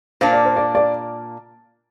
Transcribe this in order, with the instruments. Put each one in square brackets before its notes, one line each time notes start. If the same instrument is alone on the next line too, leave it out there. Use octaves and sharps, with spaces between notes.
[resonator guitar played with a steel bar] A#2 A#3 D4 [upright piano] C5 F5
[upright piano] D5
C5
D5
D5